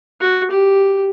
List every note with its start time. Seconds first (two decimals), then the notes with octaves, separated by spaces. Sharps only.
0.21 F#4
0.51 G4